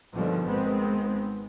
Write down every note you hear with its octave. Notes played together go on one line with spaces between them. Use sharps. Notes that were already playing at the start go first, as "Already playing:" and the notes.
G2 B2 D3 D#3 F3 G3
G#1 D#3 G#3 B3 C4